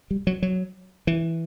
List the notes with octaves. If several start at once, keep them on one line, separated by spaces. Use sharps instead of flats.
G3
F#3
F#3
E3